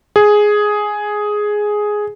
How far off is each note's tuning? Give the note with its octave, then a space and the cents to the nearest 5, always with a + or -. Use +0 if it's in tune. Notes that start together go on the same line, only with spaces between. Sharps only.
G#4 +5